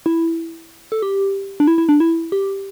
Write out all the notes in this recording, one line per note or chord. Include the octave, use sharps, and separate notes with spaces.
E4
A4
G4
D4
E4
E4
D4
E4
G4